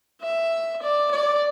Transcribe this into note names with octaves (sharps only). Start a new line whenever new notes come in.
E5
D5
D5